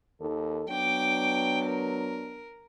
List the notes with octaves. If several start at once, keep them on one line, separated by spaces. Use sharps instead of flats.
D#2 D#3 A4
F#3 B3 D4 G5 D6
A#4